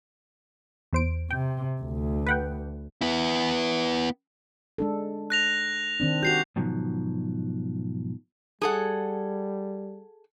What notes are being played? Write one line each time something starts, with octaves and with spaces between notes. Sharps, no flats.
E2 C5 D7
C3 G5
D2
B4 F#5 G5
B3 E4
G#3 D4 A4
F#6 A#6 F7
D#3 C4 D4
F#4 G4 G6 C7 F7
G#2 B2 D#3 F3 F#3
G3 G#4 A4 F#5